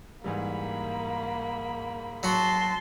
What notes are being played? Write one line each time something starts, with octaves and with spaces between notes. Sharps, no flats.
G#2 E3 G3 A#3 B5
F#3 F#4 A5 C6